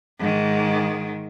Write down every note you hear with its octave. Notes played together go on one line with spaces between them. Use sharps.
G#2 D#3